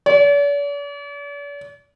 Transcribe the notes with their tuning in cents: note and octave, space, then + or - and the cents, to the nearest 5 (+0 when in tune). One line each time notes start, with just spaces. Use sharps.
D5 -45